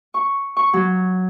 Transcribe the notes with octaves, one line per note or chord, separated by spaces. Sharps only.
C#6
C#6
F#3